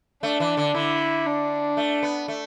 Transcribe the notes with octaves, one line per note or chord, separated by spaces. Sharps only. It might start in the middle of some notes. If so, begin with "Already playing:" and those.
A3 D4
E3
D3
D3 E4
D4
A3
B3
A3